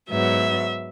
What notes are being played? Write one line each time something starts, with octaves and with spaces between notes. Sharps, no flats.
G#2 F#3 B3 E5